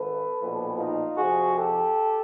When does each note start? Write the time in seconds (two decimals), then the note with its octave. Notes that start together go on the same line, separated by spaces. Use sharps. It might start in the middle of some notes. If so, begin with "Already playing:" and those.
Already playing: G#1 A4 B4
0.40 B1 A#2 F3
0.78 D#4 F4
1.17 F2 C3 F3 F#4 G#4
1.56 G4 A4